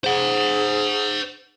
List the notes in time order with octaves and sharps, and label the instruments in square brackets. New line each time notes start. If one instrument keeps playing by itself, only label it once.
[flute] G#4 [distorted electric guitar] C5 F#5